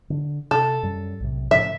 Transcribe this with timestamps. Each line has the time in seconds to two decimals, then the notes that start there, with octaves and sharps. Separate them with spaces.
0.10 D3
0.51 C3 A4
0.83 F#2 G3
1.20 B1 A2 C3
1.51 A2 C#3 F3 E5